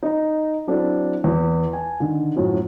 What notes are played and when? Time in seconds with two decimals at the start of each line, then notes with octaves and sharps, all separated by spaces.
0.03 D#4 A#5
0.67 F#3 C4 D4 E4 A4
1.24 E2 E3
1.73 G#5 A5
2.00 D3 D#3
2.36 F#2 A2 F3 F#3